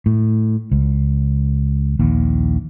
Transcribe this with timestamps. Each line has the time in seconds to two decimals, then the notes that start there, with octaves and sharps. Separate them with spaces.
0.06 A2
0.71 C#2
1.99 A#1 D#2